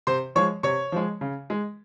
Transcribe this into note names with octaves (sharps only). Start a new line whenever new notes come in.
C3 C5 C6
F3 G#3 C#5 C#6
C3 C#5 C#6
F3 G#3
C#3
G#3